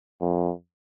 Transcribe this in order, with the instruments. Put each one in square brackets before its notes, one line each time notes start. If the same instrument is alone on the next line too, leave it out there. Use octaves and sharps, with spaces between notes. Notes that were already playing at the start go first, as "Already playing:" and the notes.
[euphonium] F2